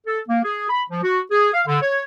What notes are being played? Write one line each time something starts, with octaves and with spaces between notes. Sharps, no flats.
A4
A#3
G#4
B5
F3
F#4
G#4
F5
D3
C#5